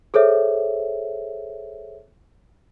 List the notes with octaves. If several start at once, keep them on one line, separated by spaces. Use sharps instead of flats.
G#4 A4 C5 C#5 E5